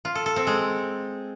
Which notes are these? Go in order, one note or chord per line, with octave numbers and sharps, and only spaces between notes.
F4
A4
A4
C4
G#3